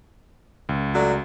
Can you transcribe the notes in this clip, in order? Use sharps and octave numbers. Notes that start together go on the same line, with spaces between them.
C#2
F#3 A3 D5